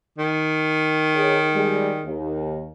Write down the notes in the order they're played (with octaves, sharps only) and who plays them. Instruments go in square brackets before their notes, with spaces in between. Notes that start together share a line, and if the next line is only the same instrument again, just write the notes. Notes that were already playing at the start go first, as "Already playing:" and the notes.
[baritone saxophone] D#3
[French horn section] D#4 G#4 C#5
G3 G#3
D#2